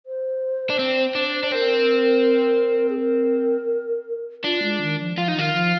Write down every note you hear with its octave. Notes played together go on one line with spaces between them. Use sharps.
C5
D4
C4
D4
D4
C4 A#4
G#4
A#4
D4 F4
G#3
D#3
F3
F3 F4
D#4
D#3 F4
F3